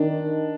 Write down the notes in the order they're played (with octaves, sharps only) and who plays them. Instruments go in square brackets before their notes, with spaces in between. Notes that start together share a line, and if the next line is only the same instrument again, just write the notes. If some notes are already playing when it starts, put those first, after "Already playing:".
Already playing: [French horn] D#3 [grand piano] D4